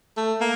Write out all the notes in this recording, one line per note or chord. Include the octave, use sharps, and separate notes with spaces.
A3
A#3